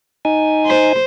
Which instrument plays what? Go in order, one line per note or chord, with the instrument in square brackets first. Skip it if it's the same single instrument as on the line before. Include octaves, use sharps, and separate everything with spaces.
[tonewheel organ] D#4 G#5
[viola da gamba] C5